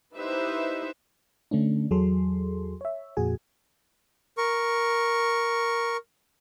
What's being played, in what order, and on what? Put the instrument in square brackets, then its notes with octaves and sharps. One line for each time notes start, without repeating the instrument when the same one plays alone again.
[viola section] D#4 E4 G4 B4 C5 E5
[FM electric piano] D3 A3 C#4 D4
E2 F#3 G#4 A4 C6
C#5 E5
F2 A#2 F#4 G#4 G#5
[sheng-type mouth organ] A#4 C#6